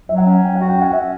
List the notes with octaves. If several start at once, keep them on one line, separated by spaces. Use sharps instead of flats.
F#3 E5
F#5
C#4
F#3 G5
F#4 F#5
G5
C#4
F#5
E5